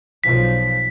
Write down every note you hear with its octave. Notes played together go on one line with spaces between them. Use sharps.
B1 F3 B6